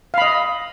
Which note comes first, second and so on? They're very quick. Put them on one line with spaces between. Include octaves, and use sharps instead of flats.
F5 B5 D#5